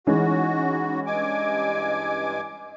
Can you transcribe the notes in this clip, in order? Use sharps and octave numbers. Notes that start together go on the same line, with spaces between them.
E3 G#3 C#4 D#4 F#4
G2 D#5 G#5 D6